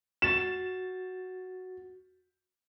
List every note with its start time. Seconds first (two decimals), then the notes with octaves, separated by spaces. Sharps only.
0.22 F#4 A6 E7